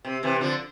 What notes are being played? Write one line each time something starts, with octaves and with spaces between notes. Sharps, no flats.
C3
C3 E3
D3 F3